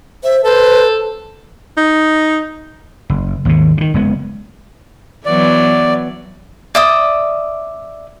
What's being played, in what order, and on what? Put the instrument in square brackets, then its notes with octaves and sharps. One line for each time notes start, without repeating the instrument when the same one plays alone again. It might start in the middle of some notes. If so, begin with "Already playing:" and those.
[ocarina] C5 [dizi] E5
[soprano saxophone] A4 [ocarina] B4 [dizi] C5
[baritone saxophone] D#4
[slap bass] F#1
G#1 D#2 B2
C3 D#3
F#1 G#3 B3
[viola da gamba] E3 F#3 B3 [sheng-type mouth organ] D5
[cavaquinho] D5 E5 D#6